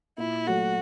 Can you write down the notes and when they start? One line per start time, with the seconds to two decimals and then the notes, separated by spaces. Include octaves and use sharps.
0.18 A#2 E4
0.46 F#3 A3 F#4